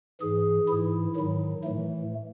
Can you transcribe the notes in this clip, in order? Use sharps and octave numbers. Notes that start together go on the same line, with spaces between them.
G#2 E3 G#4
G#2 E3 E4
G#2 D#3 F#3
A2 E3 A3